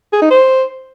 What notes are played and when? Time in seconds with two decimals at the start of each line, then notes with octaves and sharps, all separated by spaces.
0.13 G#4
0.22 D#4
0.31 C5